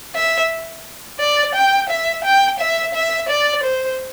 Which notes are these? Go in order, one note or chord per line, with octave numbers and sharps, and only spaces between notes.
E5
D5
G5
E5
G5
E5
E5
D5
C5